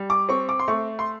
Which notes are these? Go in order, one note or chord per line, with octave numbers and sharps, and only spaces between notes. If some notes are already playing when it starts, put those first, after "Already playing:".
Already playing: G3
D6
C4 C#6
D6
C6
A3 C#6
C6